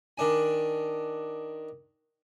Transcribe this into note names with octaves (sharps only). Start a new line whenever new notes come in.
D#3 D4 G#5